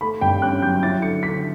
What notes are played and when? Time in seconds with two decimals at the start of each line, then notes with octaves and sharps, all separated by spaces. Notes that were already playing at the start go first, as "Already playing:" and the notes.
0.01 A3 B5
0.21 G2 G5
0.42 C#4 F#6
0.62 F#3 G6
0.83 E4 A6
1.02 D3 C#7
1.23 D3 B6